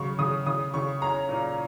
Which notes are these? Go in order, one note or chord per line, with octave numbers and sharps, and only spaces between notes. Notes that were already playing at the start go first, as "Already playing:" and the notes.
Already playing: C#3 F#3 C#6
C#3 D#6
C#3 D#6
C#3 C#6
C#4 A#5
A#2